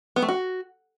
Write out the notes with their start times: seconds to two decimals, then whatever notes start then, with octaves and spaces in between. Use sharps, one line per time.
0.16 B3
0.22 A3
0.29 F#4